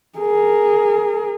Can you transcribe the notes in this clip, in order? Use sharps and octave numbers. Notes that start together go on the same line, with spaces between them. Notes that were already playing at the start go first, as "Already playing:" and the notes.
G#4 A#4